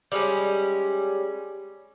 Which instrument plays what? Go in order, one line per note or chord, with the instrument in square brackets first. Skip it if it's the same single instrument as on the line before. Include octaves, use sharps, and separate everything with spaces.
[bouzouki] G3 G#3 C#4